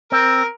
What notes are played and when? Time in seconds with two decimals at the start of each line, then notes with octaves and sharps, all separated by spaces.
0.12 C4 A#4